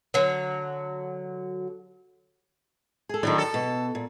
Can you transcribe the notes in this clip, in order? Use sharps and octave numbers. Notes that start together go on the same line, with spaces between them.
D3 F#3
G#4 A4
A2 D#3 F#3 D4
A4
B2
A#2